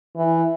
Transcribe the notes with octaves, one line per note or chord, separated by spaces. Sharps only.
E3